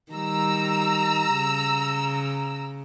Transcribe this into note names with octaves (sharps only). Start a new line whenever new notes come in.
D#3 G3 A#5 E6
C#3